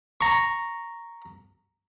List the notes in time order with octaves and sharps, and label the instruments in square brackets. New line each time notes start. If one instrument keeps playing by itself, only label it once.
[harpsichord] A#5 C#6